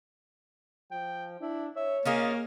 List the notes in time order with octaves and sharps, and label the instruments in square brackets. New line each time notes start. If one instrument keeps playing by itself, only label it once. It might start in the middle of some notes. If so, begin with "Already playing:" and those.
[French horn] F3 [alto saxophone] G5
[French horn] D4 [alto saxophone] E4
[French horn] C#5 [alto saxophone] E5
[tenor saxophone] A#3 [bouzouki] C#4 F4 G#4 [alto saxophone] D#5